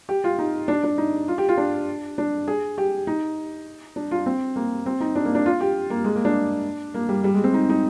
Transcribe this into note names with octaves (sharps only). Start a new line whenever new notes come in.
G4
F4
D#4
D4
D4
D#4
F4
G4
F4
D4
D4
G#4
G4
D#4
D4
F4
C4
A#3
C4
D#4
D4
A#3
D4
F4
G4
A#3
G#3
A#3
D4
A#3
G3
G3
G#3
C4
D#4
D#4